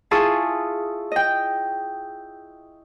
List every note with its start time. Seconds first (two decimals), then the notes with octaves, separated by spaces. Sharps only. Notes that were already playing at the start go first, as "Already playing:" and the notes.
0.11 E4 F4 G#4 A5 C#6 D#6
1.12 D#5 G5